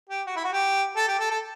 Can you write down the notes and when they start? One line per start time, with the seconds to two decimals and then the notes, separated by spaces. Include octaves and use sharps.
0.10 G4
0.27 F#4
0.36 E4
0.45 F#4
0.52 G4
0.96 A4
1.08 G4
1.19 A4
1.31 A4